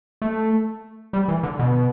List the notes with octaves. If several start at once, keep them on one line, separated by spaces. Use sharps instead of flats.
A3
G3
E3
D3
B2